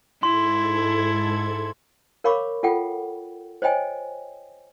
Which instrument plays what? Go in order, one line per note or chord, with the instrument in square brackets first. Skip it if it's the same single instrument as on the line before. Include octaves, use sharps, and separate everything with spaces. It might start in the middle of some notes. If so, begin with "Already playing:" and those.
[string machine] G#2 A4 G#6 [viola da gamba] E4 [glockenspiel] C6
[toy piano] A#4 C#5 F5 B5 C#6 D6
F4 A4 F#5 G5
C5 C#5 D#5 G5 G#5